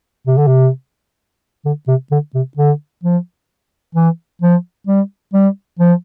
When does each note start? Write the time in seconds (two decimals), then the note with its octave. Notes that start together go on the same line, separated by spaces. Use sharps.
0.27 C3
0.38 D3
0.47 C3
1.65 D3
1.88 C3
2.11 D3
2.35 C3
2.57 D3
3.03 F3
3.95 E3
4.42 F3
4.87 G3
5.34 G3
5.79 F3